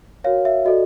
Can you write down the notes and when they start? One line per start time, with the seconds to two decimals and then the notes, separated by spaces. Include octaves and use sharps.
0.24 F#4 A#4 C#5 F5
0.45 E5
0.65 F#4 A4 D5 D#5